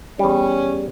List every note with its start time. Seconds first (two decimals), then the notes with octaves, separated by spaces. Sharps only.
0.19 E2 G3 C#4